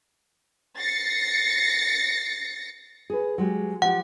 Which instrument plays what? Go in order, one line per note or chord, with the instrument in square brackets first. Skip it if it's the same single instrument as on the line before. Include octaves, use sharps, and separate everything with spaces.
[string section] A6 A#6 C7 C#7
[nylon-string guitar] G#4 B4
F#3 G#3 G4
[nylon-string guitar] F3 G4 [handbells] F#5